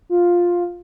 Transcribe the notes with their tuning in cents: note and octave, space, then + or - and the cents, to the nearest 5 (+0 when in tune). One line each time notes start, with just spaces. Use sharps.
F4 +5